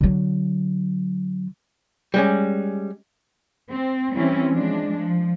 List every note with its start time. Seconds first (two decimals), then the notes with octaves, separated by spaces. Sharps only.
0.01 D3 F#3
2.14 G3 G#3 C#4
3.71 C4
4.13 E3 G3 C4 C#4 E4
4.50 F3 G#3 D4
4.96 F3